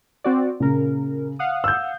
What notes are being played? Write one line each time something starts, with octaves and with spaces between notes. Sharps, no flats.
C4 F#4 D5
A#2 C#3 A#4
F5 F#5 D#6
E6 G6